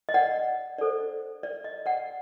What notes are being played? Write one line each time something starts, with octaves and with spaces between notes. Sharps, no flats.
D#5
D5 F#5
D4 A4 C5 D5
D5
D#5
D5 F#5